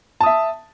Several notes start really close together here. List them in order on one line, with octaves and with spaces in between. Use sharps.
A5 D#6 E5